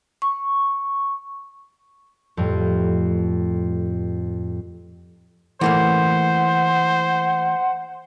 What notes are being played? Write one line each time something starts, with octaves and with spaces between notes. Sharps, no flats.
C#6
F2 A2 G3
E3 A3 A#3 C5 F#5